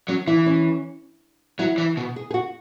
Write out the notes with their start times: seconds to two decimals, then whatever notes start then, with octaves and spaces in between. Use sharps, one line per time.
0.08 F#3 C#4
0.27 E3 E4
0.46 C#4
1.59 F#3 E4
1.78 E3
1.97 B2
2.16 G#4
2.31 G#4
2.34 F#4